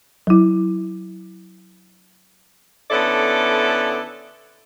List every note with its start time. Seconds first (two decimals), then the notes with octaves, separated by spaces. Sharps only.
0.27 F#3 E4
2.90 D3 B3 C#4 E4 A4 D5